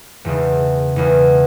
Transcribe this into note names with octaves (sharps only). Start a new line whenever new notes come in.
E1 E2 C#3
E1 E2 C#3